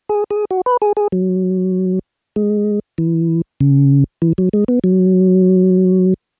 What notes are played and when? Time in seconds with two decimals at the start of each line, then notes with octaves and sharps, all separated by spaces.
0.09 G#4
0.31 G#4
0.51 F#4
0.66 B4
0.82 G#4
0.97 G#4
1.12 F#3
2.36 G#3
2.98 E3
3.61 C#3
4.22 E3
4.38 F#3
4.53 G#3
4.68 B3
4.84 F#3